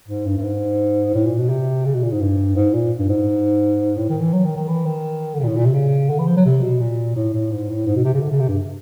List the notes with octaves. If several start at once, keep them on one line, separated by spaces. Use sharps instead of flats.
G#2
G2
G2
G#2
A2
A#2
B2
C3
C#3
B2
A#2
G#2
G2
G#2
A#2
G2
G#2
A2
D#3
E3
F#3
D#3
D#3
E3
D#3
D3
C#3
A#2
A2
A#2
C3
C#3
D3
E3
F3
F#3
C3
B2
A#2
A2
A2
G#2
A2
G#2
B2
C3
C#3
D3
C#3
C3
G2